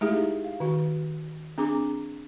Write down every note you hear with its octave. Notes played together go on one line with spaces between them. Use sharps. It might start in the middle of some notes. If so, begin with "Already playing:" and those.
G#3 A3 D#4 E4 G4 G#4
F5
D#3 F#4
C4 D4 G#4 A#5 D6